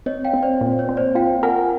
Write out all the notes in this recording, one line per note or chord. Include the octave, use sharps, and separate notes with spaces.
C4 C#5 D#5
F5 G5
C4
C5 D5
A#2
C#5
C4
C5 D5
F4 F5 G5
A#4 F#5 G#5